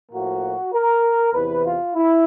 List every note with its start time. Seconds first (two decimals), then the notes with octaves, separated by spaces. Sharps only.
0.12 A2 F3 A#3 F#4
0.73 A#4
1.33 E2 C3 E3 B4
1.64 F4
1.95 E4